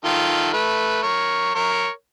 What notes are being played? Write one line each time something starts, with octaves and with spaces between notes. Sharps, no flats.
D#3 F4 A4
A3 B4
A#4 C#5
A#4 C#5